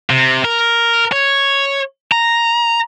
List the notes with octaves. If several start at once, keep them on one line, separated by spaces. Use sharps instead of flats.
C3
A#4
C#5
A#5